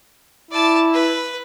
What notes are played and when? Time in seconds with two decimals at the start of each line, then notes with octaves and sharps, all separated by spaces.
0.51 E4 D5 A5
0.93 B4